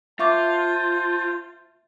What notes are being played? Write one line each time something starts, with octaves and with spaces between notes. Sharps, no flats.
F4 C5 E5 A5 C#6 D6